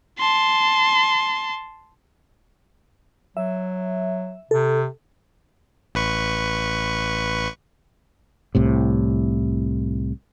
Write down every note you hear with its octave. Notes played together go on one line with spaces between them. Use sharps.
A5 C6
F#3 E5
C3 A4
A1 B4 C#6
C2 A2 C3